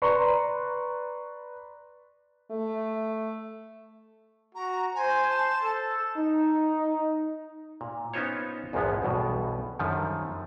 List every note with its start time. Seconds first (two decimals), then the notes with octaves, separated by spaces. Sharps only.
0.02 B4 D5 A#5 C6 C#6
2.51 A3
4.55 F#4 A#5
4.95 C5 G#5
5.29 A5
5.63 A4
6.16 D#4
7.81 A#2
8.14 B3 C#4 D#4 F4 C5 C#5
8.73 A#1 E2 G#2 F3 G#3 B3
9.02 B1 E2 G2 B2
9.79 F#2 D3 D#3 F3 G3